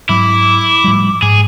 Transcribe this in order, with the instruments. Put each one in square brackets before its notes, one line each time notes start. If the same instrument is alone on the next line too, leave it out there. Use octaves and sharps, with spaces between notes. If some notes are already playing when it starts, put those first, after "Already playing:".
[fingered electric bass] G#2 F#3 [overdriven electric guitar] E4 [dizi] D6
[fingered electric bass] A2 F3 G3
[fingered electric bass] G#2 [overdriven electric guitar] G#4